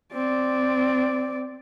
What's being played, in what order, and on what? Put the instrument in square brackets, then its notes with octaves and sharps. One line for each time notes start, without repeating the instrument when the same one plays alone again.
[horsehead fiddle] C4 D5